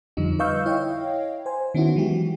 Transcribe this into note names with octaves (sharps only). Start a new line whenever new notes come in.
F2 D3 F3 G3 D#4
B4 D#5 F5 C#6 E6 G6
E4 C#5 D#5 F5 G5
C5 G#5
D#3 B3 C#4 E4 F#4
E3 F#3 G#3 F#4 G4